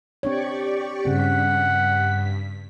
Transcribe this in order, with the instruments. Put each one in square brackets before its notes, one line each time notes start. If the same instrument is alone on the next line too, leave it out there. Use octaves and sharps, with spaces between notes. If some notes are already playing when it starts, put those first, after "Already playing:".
[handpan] C4 D4 C#5 [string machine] G4 D5 C#6
[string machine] G2 B6 [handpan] C#3 C4 [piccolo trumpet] F#5